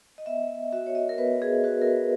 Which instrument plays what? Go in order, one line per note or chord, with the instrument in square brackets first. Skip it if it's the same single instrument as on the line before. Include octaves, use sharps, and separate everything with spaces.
[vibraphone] D#5
B3 E5
F#4 E5
C#5
D#5
A#4
B3 B4
G#4
F#4 B4
A#4
B4